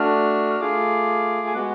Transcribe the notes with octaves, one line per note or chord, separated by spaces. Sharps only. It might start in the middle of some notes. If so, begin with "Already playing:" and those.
Already playing: A3 D4 F#4 F6
F6
A3 F4 G#4 D6
G#5
G#3 B3 F#4 F#5